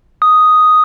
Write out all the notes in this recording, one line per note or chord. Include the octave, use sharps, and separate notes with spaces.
D#6